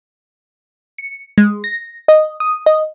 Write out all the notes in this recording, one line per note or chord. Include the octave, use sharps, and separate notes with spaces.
C#7
G#3
A#6
D#5
D#6
D#5